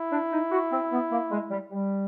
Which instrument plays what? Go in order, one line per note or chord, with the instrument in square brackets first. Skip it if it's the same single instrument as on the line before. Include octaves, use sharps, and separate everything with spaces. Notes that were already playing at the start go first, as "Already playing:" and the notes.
Already playing: [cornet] E4
[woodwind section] D4
D#4
F#4
C4
B3
A#3
G#3
G3
G3